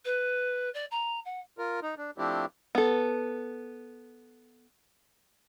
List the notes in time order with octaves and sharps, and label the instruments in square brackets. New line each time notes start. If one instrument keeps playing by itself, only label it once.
[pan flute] B4
D5
A#5
F#5
[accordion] F4 A#4
D#4
D4
F3 A3 C4 D4 E4 G4
[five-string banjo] B3 A4